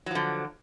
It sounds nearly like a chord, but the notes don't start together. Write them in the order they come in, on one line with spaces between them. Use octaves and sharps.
F#3 F3 D3